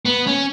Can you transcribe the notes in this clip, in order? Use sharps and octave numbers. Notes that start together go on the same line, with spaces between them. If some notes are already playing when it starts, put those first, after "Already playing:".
B3
C#4